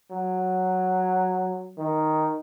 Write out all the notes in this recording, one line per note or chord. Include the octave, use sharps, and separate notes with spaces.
F#3
D#3